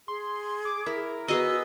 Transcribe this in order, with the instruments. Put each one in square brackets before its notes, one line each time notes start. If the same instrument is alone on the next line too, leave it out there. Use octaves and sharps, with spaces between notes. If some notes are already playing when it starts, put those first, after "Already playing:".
[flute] G#4 [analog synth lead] C6
[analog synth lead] D6
[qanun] E4 [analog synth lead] A#4
[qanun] B3 G#4 D#5 [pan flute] F#4 [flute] E6